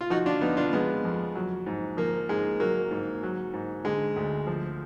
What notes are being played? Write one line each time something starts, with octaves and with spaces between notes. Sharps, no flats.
F4
F3 D#4 F#4
D4 F4
F2 B3 D#4
D4 F4
F3 G#3 B3
F2
F#3
G#2
F3 A#3
G#2 G#3
F#3 A#3
G#2
F#3
G#2
D3 G#3
D2
F3